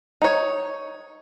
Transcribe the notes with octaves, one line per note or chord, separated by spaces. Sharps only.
D#4 C#5